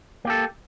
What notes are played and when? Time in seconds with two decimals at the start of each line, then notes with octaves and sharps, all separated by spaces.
0.25 A#3
0.27 G4
0.30 A4